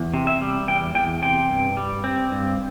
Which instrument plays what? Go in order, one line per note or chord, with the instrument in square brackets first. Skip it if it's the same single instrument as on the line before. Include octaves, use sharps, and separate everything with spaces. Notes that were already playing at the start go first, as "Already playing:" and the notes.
Already playing: [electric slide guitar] E2
C3
E5
G3
E2 G5
E2 G5
C3 G5
G2
G3
C4
G2